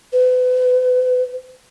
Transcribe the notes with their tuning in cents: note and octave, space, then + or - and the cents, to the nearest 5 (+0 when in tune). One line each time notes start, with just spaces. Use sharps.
B4 +35